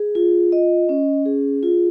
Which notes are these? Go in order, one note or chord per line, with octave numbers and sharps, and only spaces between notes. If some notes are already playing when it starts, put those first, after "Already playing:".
Already playing: G#4
F4
D#5
C#4
G#4
F4